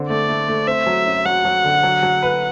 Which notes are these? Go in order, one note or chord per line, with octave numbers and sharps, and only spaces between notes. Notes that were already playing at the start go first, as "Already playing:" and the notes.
Already playing: D3 C4
A3 D5
A3
A3
C4 E5
F#3
F#2
F#3 F#5
F#3
D3
F#3
F#3
B4